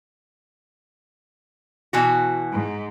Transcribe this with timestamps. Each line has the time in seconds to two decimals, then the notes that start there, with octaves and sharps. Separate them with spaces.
1.93 B2 E3 F#4
2.53 G#2